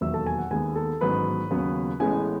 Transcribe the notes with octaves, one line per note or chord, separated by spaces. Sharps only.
E1 D#2 D#3 F#3 E5 E6
A4 A5
G#5
F#5
D#2 D#3 G#3 B3 G#5
A4 A5
A1 G#2 D#3 F#3 B3 B4 B5
D#2 C#3 F#3 B3
A1 A2 G#3 B3 G#5